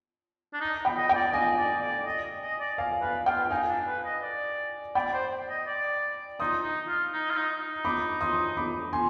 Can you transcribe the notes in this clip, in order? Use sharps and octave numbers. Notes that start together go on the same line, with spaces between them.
D4
D#4
G5 B5
D#5
G5
D5
D#5 F5 G#5
D5
D5
D#5
D#5
D5
F5 G#5
B4 F5
F4 G5
D#4 F5 G#5
D4
B4
D#5
D5
D5 G5 B5
C5
D#5
D5
D#4 C6 D#6
D#4
F4
D#4
F4
D#4
D#4
B5 D6
C6 D#6
B5 D6
G#5 C6